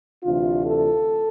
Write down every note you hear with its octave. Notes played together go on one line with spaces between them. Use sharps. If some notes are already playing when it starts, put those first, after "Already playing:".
D2 C3 E3 A3 D4 F4
A4